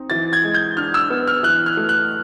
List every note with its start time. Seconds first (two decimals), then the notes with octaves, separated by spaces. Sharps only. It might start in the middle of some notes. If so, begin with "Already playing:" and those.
Already playing: C4 D#4
0.10 E3 A6
0.33 G#6
0.43 G#3
0.54 G6
0.77 D4 F6
0.94 E6
1.10 B3
1.27 F6
1.43 E3 F#6
1.66 F6
1.77 A3
1.89 F#6